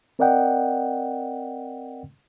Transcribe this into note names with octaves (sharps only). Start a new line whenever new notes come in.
C4 A#4 D5 D#5 F#5 G5